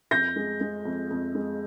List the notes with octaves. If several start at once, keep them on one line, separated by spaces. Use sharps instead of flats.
F2 G6 A#6
G#3
G#3
F2
F2
G#3